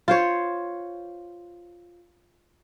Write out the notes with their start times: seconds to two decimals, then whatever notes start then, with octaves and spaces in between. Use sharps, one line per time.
0.08 F4 C5 C#5